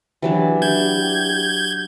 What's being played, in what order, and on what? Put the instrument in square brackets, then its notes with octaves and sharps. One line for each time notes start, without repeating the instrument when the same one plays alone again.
[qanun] E3 F#3 D4 [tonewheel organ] G4
[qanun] D4 [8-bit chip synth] G6 G#6